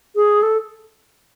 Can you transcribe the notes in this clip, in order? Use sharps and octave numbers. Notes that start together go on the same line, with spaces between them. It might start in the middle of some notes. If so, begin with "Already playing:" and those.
G#4
A4